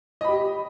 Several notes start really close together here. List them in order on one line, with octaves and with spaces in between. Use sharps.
D#5 B5 G4